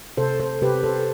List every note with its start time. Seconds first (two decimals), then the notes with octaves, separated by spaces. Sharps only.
0.17 C3 A4 C5
0.40 A4 C5
0.62 C3 G4 B4
0.84 A4 C5